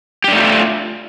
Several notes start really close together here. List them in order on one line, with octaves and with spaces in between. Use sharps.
G4 D4 A3 F4